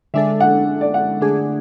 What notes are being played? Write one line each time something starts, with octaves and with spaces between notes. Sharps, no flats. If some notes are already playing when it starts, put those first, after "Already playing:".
D3 G#3 D4 A4 E5
F#5
D5
F#5
D3 A3 D4 G#4